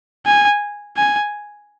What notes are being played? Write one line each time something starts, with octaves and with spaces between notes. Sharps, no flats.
G#5
G#5